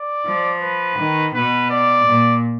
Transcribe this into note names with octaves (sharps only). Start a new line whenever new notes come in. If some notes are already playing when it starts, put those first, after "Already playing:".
Already playing: D5
F3
B4
D#3
B2 B4
D5
A#2